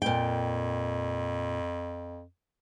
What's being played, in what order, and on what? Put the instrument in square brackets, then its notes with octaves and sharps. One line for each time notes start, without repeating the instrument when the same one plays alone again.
[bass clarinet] F2 [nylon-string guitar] A#2 G5